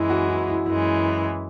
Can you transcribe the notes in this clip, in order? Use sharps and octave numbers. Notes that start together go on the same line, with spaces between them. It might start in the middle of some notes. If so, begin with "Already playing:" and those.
Already playing: F#2 E3 G#3 E4
F#4
E4
E4
F#2 E3 G#3 E4